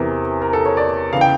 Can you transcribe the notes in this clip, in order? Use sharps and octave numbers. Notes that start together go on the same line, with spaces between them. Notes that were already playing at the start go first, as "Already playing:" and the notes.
Already playing: E2 C3 E3 A#4
A#4
A4
C#5
D5
C#3 E3 F5
G5